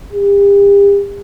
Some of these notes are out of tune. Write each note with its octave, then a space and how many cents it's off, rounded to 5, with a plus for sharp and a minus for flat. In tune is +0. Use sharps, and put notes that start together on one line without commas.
G4 +40